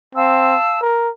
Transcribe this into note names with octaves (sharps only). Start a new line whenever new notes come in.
C4 F5 A5 E6
A#4